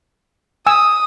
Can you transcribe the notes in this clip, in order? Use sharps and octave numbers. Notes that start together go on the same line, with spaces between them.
G#5 D#6 E6